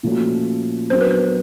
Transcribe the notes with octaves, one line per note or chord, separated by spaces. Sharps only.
A#2 F3 A3 C#4 F#4
F#3 B3 D4 F#4 A#4 C5
B4
C5